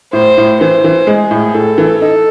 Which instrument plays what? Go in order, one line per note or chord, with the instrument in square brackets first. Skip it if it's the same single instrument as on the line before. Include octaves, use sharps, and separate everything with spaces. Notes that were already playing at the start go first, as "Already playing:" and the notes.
[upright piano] A2 [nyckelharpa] C5
[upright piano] A2
[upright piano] E3 [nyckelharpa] C5
[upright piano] E3
[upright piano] G#3 [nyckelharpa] G#4
[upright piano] A2
[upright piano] A2 [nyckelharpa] A4
[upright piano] E3
[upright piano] D#4 [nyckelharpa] A4